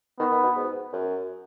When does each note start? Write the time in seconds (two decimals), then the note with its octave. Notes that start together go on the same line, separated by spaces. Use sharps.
0.19 D#3 B3
0.31 D#3
0.43 B2
0.55 G#2
0.92 F#2